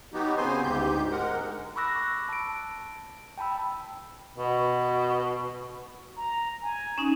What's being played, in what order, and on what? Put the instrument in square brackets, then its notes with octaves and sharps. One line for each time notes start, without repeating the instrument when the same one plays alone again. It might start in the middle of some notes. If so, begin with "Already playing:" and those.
[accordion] F#3 B3 D#4 F#4 G4
C#3 B3 C4 C5 G#5 C6
D2 G#2 G4 G6
G#3 A#4 F#5
[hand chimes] B5 C#6 D6 E6 F#6 A#6
A5 D7
G5 A5 B5 E6
[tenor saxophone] B2
[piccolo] A#5
G#5
[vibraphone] C#4 D#4